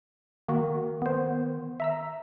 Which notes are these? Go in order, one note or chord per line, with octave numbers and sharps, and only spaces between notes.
D#3 A#3 F#4
B3 C5
E5 A#5 E6